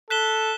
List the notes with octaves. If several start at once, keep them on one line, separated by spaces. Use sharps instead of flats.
A4 F#6 B6 E7 G7